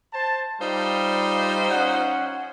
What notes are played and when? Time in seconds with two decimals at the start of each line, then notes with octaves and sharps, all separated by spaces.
0.13 C5 A5
0.61 G3 D#4 F4 C5
1.71 C#4 F#5